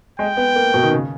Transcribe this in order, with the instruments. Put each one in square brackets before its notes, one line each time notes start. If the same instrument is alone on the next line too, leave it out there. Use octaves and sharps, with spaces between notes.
[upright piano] G#3 [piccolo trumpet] G5
[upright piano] B3
A#3
B2
D#3
C#3